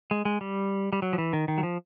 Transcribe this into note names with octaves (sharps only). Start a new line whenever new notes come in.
G#3
G#3
G3
G3
F#3
F3
E3
D#3
D#3
F#3
F3